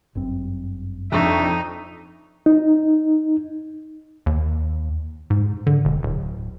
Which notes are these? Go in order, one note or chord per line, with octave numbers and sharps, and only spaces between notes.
G1 F#2 C4
F2 D4 D#4 E5 C#6
D#4
D#2
G#2
D3
E1
D1